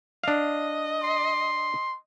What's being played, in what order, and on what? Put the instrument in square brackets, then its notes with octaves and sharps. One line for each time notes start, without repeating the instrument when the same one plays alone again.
[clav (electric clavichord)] D4 F5 [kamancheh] D#5
[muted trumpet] C6